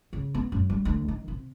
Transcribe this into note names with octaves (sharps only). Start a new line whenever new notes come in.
C#3
B3
F#2
G3
D2
D#3
C3